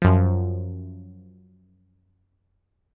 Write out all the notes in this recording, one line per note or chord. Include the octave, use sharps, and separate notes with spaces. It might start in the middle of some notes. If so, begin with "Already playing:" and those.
F#2 F3